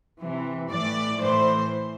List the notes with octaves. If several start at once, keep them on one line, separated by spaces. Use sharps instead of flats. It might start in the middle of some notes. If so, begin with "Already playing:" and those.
C3 E3
A2 E3 D5
A2 E3 C5